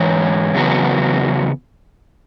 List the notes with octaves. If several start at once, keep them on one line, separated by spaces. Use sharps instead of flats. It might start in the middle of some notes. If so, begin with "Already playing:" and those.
Already playing: G#2 E3 C#5
E2 C#3 F#3 B3